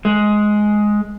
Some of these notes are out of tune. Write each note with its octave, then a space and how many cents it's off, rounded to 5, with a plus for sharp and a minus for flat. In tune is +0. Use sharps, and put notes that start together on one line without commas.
G#3 +10